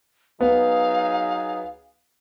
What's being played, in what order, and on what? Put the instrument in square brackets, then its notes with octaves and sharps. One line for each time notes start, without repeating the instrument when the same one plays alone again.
[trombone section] F#3 D#4 G#4 [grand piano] B3 [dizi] F5